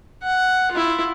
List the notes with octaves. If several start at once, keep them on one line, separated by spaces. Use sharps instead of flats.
F#5
E4 F4